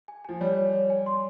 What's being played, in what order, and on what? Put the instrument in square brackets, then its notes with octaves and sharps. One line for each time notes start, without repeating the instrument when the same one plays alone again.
[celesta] G#5
[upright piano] F3 [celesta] G#5
[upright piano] G3 [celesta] C#5
[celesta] C#5
C#5
G#5
C6